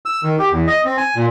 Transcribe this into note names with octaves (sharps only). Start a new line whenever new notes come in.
E6
D#3
G4
E2
D#5
C4
G#5
A#2